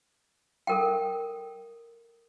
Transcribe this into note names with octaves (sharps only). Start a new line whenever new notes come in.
A4 A#4 G5